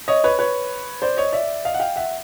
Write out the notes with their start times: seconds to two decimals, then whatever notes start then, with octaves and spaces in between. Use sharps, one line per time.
0.08 C#5 D#5
0.24 B4 C#5
0.39 B4 C#5
1.02 C5 D5
1.17 C#5 D#5
1.33 D5 E5
1.65 D#5 F5
1.74 F#5
1.80 F5 G5
1.96 E5 F#5